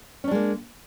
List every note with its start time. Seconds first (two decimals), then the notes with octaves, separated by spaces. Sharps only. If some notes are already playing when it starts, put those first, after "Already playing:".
0.24 C#4
0.28 D4
0.31 G#3
0.35 A#3